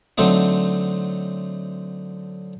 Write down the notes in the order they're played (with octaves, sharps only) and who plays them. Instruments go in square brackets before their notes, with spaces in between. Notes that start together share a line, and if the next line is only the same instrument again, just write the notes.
[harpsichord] D3 F#3 A3 C4 D#4